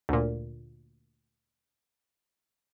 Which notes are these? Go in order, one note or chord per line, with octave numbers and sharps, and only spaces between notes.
D2 A#2